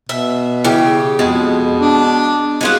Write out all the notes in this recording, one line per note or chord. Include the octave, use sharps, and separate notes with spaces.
B2 E5
C#3 E3 G4
F2 B2 G#3
D4
C2 G#3 F4 F#4